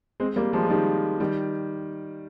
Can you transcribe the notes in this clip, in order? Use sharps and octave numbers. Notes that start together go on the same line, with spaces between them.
G#3 C4
G3 A#3
F3 G#3
G#3
D#3 G3
D#3 G3